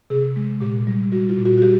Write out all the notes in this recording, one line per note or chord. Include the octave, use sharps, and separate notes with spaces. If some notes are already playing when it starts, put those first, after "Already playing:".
C3 G#4
G#3
A#2 G4
G3
G3 F#4
F4
A#2
F#4
F#4
G3 G4